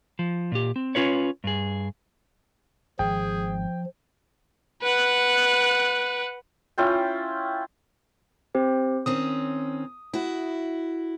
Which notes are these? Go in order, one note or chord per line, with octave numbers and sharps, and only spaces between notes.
F3
A#2 G4
C4
C#4 F4 B4 C#5
G2 G#4
G#1 F3 G#4 G5
B4 F#5
C#4 E4 F4 G5
C4 G4 C5
D#3 C4 C#4 D#6
E4 F#4